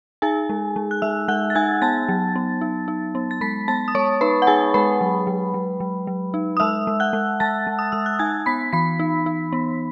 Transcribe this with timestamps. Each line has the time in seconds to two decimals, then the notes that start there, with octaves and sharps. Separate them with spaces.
0.22 D#4 G#4 G#5
0.50 G#3
0.76 G#3
0.91 F#6
1.02 G#3 E5 E6
1.28 G#3 F#5 F#6
1.50 A6
1.55 D#4 G#5 G#6
1.82 B3 A5 A6
2.09 F#3
2.36 B3
2.61 D#4
2.88 D#4
3.15 B3
3.31 A6
3.41 G#3 B5 B6
3.68 B3 A5 A6
3.88 D#6
3.95 G#3 C#5 C#6
4.21 D#4 B4 B5
4.42 F#5
4.47 D#4 G#4 G#5
4.74 G#3 B4 B5
5.01 F#3
5.27 F#3
5.54 F#3
5.80 F#3
6.07 F#3
6.34 D#4
6.57 D#6
6.60 G#3 E5 E6
6.87 G#3
7.00 F#5 F#6
7.13 G#3
7.40 G#3 A5 A6
7.67 G#3
7.79 D#6
7.92 G#3 E6
8.06 F#6
8.19 D#4 G#5 G#6
8.46 B3 B5 B6
8.73 E3 B5 B6
9.00 D#4
9.26 D#4
9.53 B3